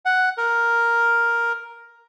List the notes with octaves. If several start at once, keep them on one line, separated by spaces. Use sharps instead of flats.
F#5
A#4